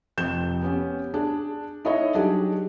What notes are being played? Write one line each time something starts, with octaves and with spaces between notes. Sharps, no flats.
F1 F2 C4 G6 E7
B3 C#4 G4
D4 G#4
D#4 E4 A4 C#5 D#5
F#3 G3 D4 D#4 G4 G#4